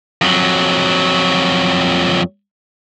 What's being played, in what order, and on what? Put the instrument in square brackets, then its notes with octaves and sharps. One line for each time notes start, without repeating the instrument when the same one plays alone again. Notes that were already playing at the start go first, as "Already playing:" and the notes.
[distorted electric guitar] F2 F#3